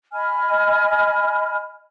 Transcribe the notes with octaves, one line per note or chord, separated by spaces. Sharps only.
D#5 G#5 B5 F6